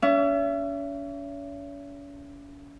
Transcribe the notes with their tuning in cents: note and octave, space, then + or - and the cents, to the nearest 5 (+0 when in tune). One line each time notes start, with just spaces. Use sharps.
C#4 +40 E5 +35